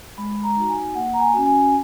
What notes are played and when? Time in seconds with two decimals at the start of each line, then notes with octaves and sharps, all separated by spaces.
0.18 G#3 B5
0.43 A#5
0.56 D#4 F#4
0.69 G#5
0.95 A#3 F#5
1.13 A#5
1.20 G#5
1.33 C#4 F#4
1.46 G#5